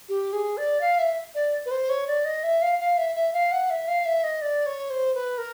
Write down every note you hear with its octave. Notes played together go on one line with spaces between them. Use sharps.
G4
G#4
D5
F5
E5
D5
B4
C5
C#5
D5
D#5
E5
F5
F5
E5
E5
F5
F#5
E5
F5
E5
D#5
D5
C#5
C5
B4
A#4